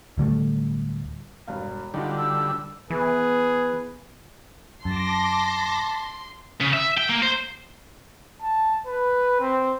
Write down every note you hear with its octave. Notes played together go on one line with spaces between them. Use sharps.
D1 D3 G3 A3
E1 G2 F5
D3 G3 D#4 F4 F#4
E6
E3 B3 G#4 B4
F#2 A5 C6 D6 A#6
C#3
E5
G5
A#3
C5
A5
B4
C4